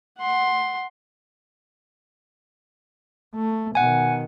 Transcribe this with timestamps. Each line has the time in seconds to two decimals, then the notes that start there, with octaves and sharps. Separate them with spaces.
0.19 F#5 C6
3.35 A3
3.75 B2 D#3 F#5 G#5